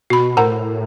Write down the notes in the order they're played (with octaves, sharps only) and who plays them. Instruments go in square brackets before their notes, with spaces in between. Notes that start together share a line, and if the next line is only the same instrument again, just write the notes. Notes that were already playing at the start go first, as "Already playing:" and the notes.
[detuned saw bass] B2 [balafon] F#4 B5
[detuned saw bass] A2 [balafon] A#4 [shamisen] C5 F#5 A#5